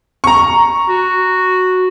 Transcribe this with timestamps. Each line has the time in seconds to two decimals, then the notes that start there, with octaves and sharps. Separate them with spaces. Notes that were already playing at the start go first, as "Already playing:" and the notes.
0.24 A#5 C#6
0.88 F#4